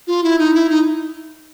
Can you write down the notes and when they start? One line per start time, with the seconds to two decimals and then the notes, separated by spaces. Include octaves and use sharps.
0.07 F4
0.24 E4
0.39 D#4
0.54 E4
0.70 D#4